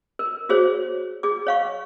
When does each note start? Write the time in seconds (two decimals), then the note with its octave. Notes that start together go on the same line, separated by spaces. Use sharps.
0.19 A#4
0.49 F#4 G#4 C5 C#5
1.23 G#4 D6
1.47 C#5 F5 C#6